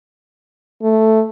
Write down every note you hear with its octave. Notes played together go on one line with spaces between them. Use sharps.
A3